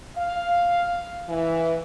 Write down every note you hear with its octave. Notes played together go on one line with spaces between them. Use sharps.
F5
E3